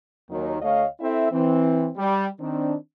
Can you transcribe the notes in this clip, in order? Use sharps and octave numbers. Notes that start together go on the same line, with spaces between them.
D#2 D#3 F#3
D2 A3 C#5 D#5 F5
C4 E4 A4 E5
E3 C4
G3
D#3 C4 D4